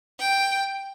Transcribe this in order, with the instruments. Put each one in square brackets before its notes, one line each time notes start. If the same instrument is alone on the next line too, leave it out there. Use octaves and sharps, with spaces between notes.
[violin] G5